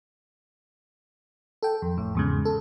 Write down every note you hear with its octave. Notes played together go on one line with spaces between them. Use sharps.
A4 G5
F2
A1 A2
E2 G#2 C#3
A4